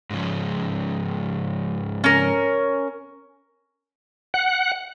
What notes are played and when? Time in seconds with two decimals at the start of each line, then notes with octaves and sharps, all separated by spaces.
0.10 G#2 C#3 F3
2.04 C#4 A#4
4.34 F#5